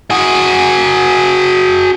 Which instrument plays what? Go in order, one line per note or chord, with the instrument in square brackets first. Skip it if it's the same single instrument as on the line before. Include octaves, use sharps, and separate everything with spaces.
[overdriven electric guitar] F#4 G#4